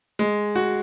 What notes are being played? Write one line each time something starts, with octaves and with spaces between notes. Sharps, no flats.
G#3
F#4